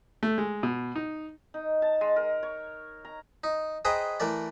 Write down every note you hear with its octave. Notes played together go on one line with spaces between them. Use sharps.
A3
G#3
B2
D#4
D#4
A5
G#3
A#4
C#5
A#5
D#4
G#4 B4 C5 D#5 G5 A#5
E3 A3 A#4 D5